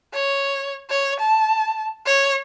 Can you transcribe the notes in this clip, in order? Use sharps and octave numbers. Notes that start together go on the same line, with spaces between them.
C#5
C#5
A5
C#5